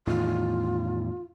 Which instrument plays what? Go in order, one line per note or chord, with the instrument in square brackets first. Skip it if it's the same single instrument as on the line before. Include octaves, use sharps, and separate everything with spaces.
[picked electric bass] E2 A2 D#3 [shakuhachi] F4